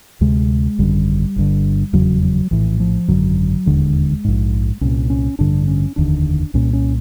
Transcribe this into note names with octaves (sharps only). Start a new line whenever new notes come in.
D2 C3 G#3
G#1 F#2 D3 G3
G1 G2 D3
F1 E2 C#3 F#3
F#3
A#1 A2 E3
F3
G#1 F#2 D3 F#3
E1 D#2 D3 G#3
A#1 G#2
C2 A#2 C#4
C#4
A1 G2 D3 D4
C#4
F1 D#2 D3 D4
C2 A#2 C#4
C#4